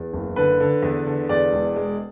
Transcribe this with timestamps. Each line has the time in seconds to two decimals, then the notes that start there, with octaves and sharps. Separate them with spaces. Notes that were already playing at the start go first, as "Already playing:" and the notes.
Already playing: E2
0.13 F#1
0.36 D3 B4
0.60 D3
0.83 E2
1.06 D3
1.29 E2 D5
1.53 E1
1.76 G#3